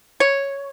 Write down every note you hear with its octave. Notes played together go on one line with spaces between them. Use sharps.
C#5